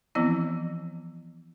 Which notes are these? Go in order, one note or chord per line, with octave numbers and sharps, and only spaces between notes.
E3 F3 B3 C4 E4